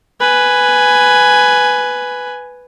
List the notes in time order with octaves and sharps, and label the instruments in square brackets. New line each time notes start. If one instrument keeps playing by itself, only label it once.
[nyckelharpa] B4 G#5